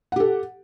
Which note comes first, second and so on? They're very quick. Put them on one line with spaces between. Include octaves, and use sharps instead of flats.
F#5 G4 A4